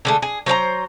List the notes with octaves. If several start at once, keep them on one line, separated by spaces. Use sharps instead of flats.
D3 G#3 A3
G#4
F#3 C5 C#5 A#5